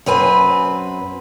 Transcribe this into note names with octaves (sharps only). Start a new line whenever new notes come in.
F#2 C4 B4 G#5